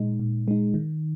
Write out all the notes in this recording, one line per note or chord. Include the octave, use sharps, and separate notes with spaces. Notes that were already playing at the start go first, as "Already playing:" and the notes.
Already playing: A#2 G#3 D#4
A#2
G#3 D#4
D#3